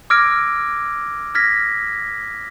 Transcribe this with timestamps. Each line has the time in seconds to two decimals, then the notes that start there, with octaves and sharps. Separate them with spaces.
0.10 D6 E6 F6 G#6 A#6 D7
1.35 F6 G#6 A#6 B6